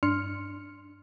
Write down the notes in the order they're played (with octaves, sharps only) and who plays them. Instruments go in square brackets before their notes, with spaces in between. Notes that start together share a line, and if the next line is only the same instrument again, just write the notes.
[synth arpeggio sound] G2 D4 C6 F6 C#7